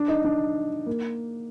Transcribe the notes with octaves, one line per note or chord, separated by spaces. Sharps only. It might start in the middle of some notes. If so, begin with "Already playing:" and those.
Already playing: D4
D#4
D4
A#3